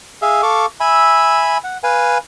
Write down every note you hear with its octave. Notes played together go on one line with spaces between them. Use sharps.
G#4 E5 F5
A4 F5 C#6 D6
E5 G#5 B5 E6
F#5
B4 F5 G#5